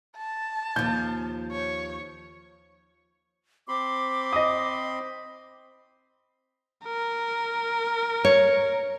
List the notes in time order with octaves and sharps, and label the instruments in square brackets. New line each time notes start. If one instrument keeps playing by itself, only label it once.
[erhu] A5
[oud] D#2 F3 [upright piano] G6
[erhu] C#5
[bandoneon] C4 B5 C6 [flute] D6
[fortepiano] D#5 D#6
[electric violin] A#4
[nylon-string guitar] C#5